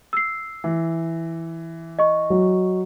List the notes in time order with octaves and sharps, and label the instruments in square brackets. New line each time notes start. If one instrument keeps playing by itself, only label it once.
[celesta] E6 C7
[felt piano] E3
[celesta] D#5 C#6
[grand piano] F#3